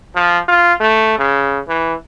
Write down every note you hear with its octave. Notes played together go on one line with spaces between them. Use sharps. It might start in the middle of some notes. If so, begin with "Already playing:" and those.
F3
F4
A3
C#3
E3